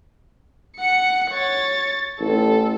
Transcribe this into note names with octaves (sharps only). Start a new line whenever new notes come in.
F#5 C#7
C#5 A6
A1 A4